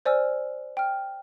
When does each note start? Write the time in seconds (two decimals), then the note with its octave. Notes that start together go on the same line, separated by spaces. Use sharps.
0.05 C5 D5 G#5 E6 F6
0.77 G5 F6